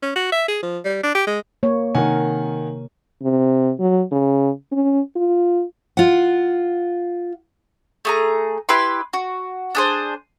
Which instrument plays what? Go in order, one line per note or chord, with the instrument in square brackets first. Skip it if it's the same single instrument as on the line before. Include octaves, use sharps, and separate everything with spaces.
[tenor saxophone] C#4
F#4
E5
G#4
F3
G3
D4
G4
G#3
[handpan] A#3 C#5
[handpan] C3 A#4 [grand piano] D#3 F#5 G#5
[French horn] C3
F#3
C#3
C#4
F4
[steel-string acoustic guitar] F4 F#5
[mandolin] A3 G#4 A#5
E4 G4 B4 C6
F#4
D4 G#4 C5